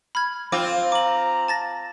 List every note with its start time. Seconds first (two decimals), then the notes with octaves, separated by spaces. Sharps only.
0.15 B5 F6 G#6
0.52 C4 F4 D6
0.92 A#5 D6 F#7
1.48 A5 A6 A#6